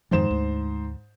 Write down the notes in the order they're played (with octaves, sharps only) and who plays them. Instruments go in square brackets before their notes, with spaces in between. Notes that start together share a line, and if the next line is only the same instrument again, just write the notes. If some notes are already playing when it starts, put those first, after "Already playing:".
[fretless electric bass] F2 D#3 F3 [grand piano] G#2 C5 E7
[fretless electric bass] D2